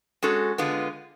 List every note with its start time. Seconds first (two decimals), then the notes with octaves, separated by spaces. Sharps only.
0.23 G#3 C#4 F#4 A4
0.58 D3 G#3 B3 F4